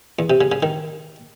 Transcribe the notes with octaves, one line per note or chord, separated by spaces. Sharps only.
E2
C3
C#3
C#3
D#3